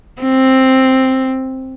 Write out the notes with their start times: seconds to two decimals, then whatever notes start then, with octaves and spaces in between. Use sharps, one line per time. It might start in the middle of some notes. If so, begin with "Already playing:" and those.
0.22 C4